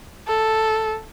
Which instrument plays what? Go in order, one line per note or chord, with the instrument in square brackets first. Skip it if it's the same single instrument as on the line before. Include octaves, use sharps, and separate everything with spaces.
[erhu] A4